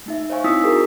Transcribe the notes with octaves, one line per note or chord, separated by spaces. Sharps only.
A3 D#4 E5
C5 C#5 D#5 F5 G#5 C#6
C4 D#4 E4 D#6 E6 B6
F#4 G#4 A#4